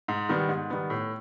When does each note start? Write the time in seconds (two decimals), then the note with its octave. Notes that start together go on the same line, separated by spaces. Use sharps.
0.08 G#2
0.29 D#3 G3 B3
0.49 G#2
0.70 D#3 G3 B3
0.90 A2